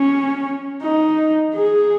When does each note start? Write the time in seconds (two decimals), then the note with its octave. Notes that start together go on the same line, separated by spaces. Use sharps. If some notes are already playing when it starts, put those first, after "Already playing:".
Already playing: C#4
0.82 D#4
1.55 G#4